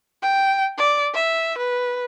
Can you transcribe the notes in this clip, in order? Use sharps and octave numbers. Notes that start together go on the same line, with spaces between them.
G5
D5
E5
B4